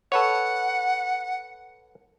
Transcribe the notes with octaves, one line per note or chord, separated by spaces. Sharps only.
A4 B4 C#5 F#5